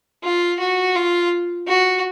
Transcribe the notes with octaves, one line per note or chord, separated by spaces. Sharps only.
F4
F#4
F4
F#4